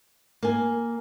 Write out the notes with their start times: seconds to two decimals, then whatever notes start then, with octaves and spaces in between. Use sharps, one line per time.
0.43 A#3 G#5